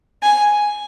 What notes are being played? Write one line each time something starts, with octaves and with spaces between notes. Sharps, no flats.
G#5